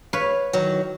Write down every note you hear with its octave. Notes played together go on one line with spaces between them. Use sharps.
B4 C#5 F5
D#3 E3 F#3